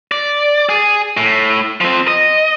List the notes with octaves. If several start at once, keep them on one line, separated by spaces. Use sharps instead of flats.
D5
G#4
A2
F3 C4
D#5